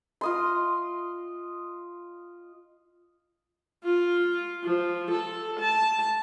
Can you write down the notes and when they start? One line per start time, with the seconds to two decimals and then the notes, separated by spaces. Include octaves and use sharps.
0.21 F4 D#5 C6
3.85 F4
4.64 F3
5.11 A4
5.60 A5